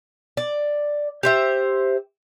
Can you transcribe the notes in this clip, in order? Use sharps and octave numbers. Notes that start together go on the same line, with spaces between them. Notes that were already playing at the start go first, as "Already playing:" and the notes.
D5
G4 C5 E5